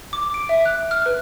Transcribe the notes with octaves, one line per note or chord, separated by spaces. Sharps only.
D6
D7
E5
F#6
F6
B4